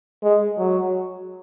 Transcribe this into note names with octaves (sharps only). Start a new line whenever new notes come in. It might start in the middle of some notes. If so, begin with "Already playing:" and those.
G#3
F#3